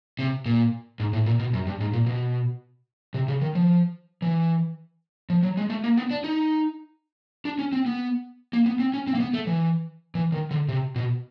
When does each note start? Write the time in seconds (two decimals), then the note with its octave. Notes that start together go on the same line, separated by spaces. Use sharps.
0.19 C3
0.46 A#2
1.00 G#2
1.13 A2
1.26 A#2
1.39 B2
1.53 F#2
1.67 G2
1.80 G#2
1.93 A#2
2.06 B2
3.14 C3
3.28 C#3
3.41 D#3
3.55 F3
4.22 E3
5.30 F3
5.43 F#3
5.57 G#3
5.70 A3
5.84 A#3
5.97 B3
6.11 D4
6.24 D#4
7.45 D4
7.59 C#4
7.72 C4
7.86 B3
8.53 A#3
8.66 B3
8.79 C4
8.94 C#4
9.07 C4
9.15 A#3
9.20 B3
9.34 A3
9.47 E3
10.15 E3
10.32 D#3
10.51 D3
10.68 C3
10.96 B2